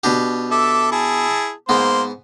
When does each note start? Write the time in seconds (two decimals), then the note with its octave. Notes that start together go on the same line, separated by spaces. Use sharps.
0.04 B2 D4 G4
0.51 A4 E5 D6
0.91 E4 G#4 A5
1.69 G#2 A#3 B3 C5